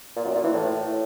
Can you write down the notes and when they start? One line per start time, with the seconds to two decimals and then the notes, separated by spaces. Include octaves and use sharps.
0.16 A#2
0.26 F#2
0.35 A#2
0.44 E3
0.53 A2